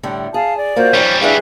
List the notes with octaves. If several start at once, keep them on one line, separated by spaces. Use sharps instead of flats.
A2 D3 G3
G#4 F5 A5
D5
A#3 F4 F#4 C5
F2 G3 C#4 D#4 C#5
D4 E4 G#4 B4 E5 F5